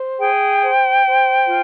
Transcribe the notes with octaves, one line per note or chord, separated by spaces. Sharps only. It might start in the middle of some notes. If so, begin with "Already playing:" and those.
Already playing: C5
G#4 G5
C5
C5
F4